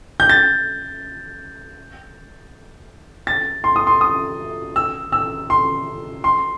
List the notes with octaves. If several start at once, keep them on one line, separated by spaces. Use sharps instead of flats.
G6
A6
A6
C6
D#6
C6
D#6
E6
E6
C6
C6